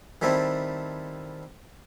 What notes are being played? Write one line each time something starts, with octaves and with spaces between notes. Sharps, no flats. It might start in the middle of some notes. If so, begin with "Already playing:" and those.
D#3 G3 A3 C4 E4